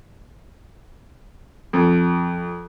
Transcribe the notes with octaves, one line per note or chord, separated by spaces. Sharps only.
F2